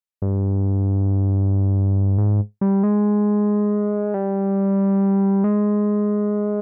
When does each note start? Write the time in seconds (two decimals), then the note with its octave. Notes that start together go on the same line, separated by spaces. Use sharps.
0.22 G2
2.18 G#2
2.61 G3
2.84 G#3
4.14 G3
5.44 G#3